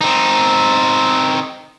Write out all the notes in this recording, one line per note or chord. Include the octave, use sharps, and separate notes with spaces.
C4 D#4